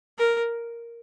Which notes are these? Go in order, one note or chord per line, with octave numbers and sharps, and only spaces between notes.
A#4